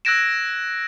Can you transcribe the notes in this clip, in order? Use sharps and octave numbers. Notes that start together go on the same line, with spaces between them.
E6 F#6 G#6 A#6 D7 E7